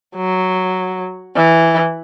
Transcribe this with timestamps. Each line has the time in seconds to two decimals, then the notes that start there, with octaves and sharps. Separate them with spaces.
0.16 F#3
1.36 E3